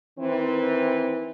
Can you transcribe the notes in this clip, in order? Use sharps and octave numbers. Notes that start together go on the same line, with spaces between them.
D#3 E3 C4